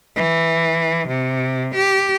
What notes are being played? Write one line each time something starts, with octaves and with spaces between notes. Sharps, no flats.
E3
C3
G4